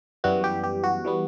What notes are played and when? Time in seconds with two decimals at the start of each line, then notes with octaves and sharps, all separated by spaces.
0.24 F#2 E3 G3 B3 F#4
0.44 G4
0.63 G4
0.84 F#4
1.04 E3 G3 B3